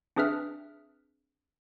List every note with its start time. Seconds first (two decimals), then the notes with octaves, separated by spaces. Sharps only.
0.16 C4 D4 G#4 B4 E5 F6